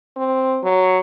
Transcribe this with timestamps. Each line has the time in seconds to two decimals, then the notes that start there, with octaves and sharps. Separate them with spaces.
0.16 C4
0.64 F#3